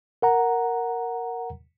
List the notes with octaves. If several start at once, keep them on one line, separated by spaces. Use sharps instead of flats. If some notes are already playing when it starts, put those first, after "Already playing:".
A#4 F#5 A#5